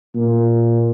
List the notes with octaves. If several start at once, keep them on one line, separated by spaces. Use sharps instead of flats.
A#2